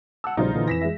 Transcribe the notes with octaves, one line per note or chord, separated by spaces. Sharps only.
F#5 A5 E6
A#1 C#3 G3 D#4 F4 C5
A#2 D3 E3
F2 E3 A#6 B6 E7
G#3 E5